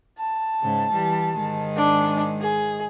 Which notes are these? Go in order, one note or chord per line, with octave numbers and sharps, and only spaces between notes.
A5
G#2 C#3
E3 G3
G#2 D#3 G#3
D4
G#4